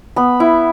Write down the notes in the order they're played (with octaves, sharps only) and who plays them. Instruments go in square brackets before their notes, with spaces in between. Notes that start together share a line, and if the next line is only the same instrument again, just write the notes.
[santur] B3 B5
E4